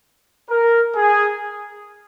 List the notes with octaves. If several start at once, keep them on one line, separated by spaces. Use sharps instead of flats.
A#4
G#4